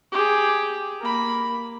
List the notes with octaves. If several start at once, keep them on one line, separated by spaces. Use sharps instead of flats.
G4 G#4
A#3 B5